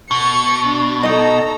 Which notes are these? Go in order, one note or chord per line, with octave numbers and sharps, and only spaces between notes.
B2 C#6 C#7 G7
D4
D#4 A4 D#5 A#5